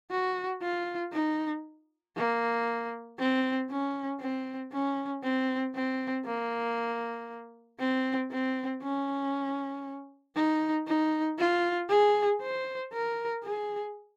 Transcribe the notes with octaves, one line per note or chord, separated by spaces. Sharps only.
F#4
F4
D#4
A#3
C4
C#4
C4
C#4
C4
C4
A#3
C4
C4
C#4
D#4
D#4
F4
G#4
C5
A#4
G#4